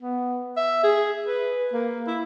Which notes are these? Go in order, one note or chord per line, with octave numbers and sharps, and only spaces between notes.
B3
E5
G#4
B4
A#3
E4